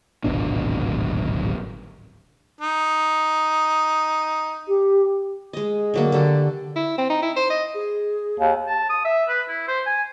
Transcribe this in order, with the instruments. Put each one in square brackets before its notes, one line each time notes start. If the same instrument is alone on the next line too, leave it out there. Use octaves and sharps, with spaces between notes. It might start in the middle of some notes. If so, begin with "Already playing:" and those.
[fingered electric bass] D1 G#1 B2 D4
[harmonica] D#4
[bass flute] G4
[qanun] G#3 D#5
D3 F#3 A#3
D3 G4 A4
[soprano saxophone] E4
C4
D#4
E4
C5
D#5
[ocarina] G#4
[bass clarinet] D#2
[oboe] A5
D#6
E5
B4
E4
C5
G#5